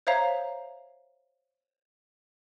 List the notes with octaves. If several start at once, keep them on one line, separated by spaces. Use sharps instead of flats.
C5 C#5 E5 F5 A#5